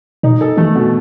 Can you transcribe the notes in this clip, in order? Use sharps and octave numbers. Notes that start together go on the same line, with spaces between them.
B2 D#4
A4
E3 A3
B2